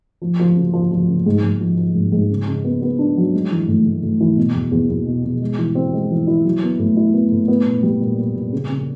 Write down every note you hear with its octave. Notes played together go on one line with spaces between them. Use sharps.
F3
F3
C#3
F3
F3
C#3
G#2
G#2
F3
F3
G#2
G#2
C#3
C#3
B3
B3
D4
F#3
G#3
E3
A2
A2
A2
E3
B2
E2
E2
E2
B2
B2
G#3
E3
C4
G#3
E3
E4
F#3
B3
A2
E4
B3
A2
B3
A#2
G3
A#2
A#2
A#2
C#3
C#3